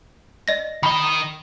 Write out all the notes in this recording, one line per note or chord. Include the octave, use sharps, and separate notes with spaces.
D5 D#5 A#6
D#3 D#5 B5